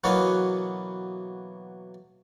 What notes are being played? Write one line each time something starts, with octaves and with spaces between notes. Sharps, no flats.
B2 E3 F#3 A#3 B3